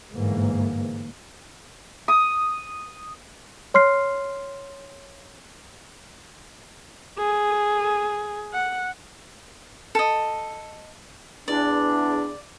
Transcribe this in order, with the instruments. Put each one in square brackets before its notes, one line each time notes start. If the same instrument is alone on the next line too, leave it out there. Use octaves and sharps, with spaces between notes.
[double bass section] G1 G#2 E3 A#3
[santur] D#6
[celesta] C#5 C6 F6 C7
[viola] G#4
F#5
[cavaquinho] A4 D#5
[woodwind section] E2 D4 [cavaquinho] D5